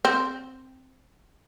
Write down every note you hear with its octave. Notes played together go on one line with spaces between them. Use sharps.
C4